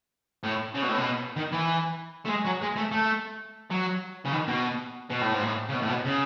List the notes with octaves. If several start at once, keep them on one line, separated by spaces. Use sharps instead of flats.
A2
C#3
B2
A2
B2
D#3
E3
A3
G#3
F#3
G#3
A3
A3
F#3
C#3
D#3
B2
B2
A2
G#2
A2
C#3
B2
A2
B2
C#3